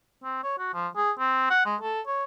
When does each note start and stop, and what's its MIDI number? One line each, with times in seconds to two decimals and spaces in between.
0.24 0.43 60
0.43 0.55 73
0.58 0.69 66
0.74 0.88 53
0.97 1.11 68
1.19 1.46 60
1.50 1.63 78
1.65 1.76 56
1.81 2.01 69
2.07 2.24 73